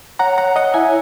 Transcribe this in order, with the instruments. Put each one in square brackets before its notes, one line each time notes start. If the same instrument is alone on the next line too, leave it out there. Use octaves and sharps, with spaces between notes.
[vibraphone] C#5 [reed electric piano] F#5 A#5
[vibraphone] C#5 [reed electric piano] F#5 A#5
[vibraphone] C#5 [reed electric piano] D#5 F#5
[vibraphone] E4 [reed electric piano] E5 G#5